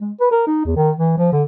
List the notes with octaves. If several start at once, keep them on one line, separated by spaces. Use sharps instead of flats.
G#3
B4
A#4
D#4
E2
D#3
E3
F3
D3